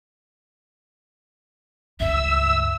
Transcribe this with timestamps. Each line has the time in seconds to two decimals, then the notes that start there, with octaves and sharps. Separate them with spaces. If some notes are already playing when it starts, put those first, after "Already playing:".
2.00 C#2 G2 E5 E6